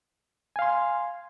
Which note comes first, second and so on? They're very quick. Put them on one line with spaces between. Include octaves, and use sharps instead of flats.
G#5 F5 C6